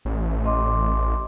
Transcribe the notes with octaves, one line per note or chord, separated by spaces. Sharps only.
A1
D#5 C6 D6